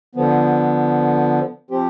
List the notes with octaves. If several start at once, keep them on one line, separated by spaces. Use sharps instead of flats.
D3 F3 B3
F3 C4 G4